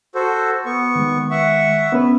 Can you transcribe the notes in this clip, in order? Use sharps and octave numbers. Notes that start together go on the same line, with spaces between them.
F#4 A4 C5
B3 C#6
D#3 G#3
E5 F#5 C#6
B3 C#4 B4